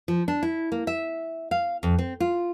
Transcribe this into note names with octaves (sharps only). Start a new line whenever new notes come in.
F3
D4
E4
A#3
E5
F5
F2
C4
F4